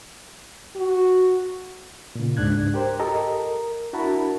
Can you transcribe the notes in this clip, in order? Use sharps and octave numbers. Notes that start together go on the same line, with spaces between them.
F#4
A#2 C#3
C#2 G#2 D4 F#6 G#6
G4 A#4 C5
G4 A4 A#4 D#5 A#5
A#4
D4 E4 F#4 A#4 A5 B5